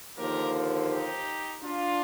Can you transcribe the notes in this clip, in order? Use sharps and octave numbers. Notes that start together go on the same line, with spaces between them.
D#2 D3 F3 A#3 G4 A#4
D#4 G4
D4 F4